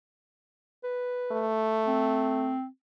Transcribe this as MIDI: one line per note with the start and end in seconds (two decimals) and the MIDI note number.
0.84 1.47 71
1.32 2.56 57
1.87 2.66 60